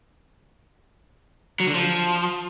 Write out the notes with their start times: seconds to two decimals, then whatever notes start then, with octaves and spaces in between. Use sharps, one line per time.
1.60 F#3
1.67 D3
1.74 F3